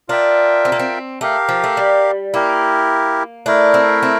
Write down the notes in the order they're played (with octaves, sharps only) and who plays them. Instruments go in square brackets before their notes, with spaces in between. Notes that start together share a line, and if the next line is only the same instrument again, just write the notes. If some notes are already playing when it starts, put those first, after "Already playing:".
[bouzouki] D4 [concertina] F4 A#4 E5 G5
[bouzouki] C4
A#3
C4
[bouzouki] A3 [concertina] G4 A#4 F5
[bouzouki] F3
A3
G3
[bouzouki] A#3 [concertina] E4 G4 A#4
[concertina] A3 E4 A#4 [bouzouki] D4
[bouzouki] C4
C4